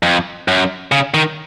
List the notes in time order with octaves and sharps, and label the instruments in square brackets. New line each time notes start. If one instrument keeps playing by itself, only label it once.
[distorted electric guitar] F2
F#2
C#3
D#3